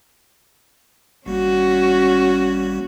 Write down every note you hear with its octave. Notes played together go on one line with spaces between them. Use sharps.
G#1 G3 A#3 C#4 F#4